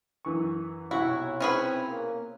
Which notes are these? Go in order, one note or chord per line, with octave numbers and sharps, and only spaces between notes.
F#2 E3 C#6
B1 C3 E4 F#4 C#5
C4 C#4 G#4 B4
A#3